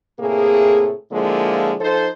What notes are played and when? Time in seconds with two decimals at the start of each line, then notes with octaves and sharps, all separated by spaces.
0.20 A2 C3 A#3 G#4
1.12 D3 F3 G#3 A#3 E4 F4
1.81 F3 D#4 A4 C5